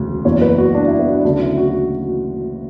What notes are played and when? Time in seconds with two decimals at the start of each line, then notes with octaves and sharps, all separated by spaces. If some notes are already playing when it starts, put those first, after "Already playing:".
Already playing: E1 D2 C#3
0.25 F#1 E2 B2 F#3 C#5
0.42 B4
0.58 F#4
0.74 D4
0.87 E4
0.99 B3
1.11 D4
1.25 D2 C#3 F#3 D4
1.41 E4
1.58 F#4
1.74 F#4